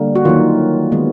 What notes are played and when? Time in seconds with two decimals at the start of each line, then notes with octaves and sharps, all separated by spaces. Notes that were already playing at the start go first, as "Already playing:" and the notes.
Already playing: D3 G3 A#3
0.15 F#4
0.25 D#3 F#3 A#3 F4
0.92 D#3 G#3 B3